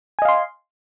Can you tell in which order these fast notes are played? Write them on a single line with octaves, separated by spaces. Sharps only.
G#5 D#5 F5 C6